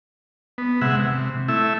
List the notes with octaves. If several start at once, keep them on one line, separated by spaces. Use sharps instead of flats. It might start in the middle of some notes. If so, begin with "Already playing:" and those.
B3
C3 G#3 E5 F#5
C3
A3 E4 E5